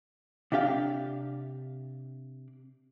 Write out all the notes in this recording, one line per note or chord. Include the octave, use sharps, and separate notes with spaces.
C3 D4 G4 F5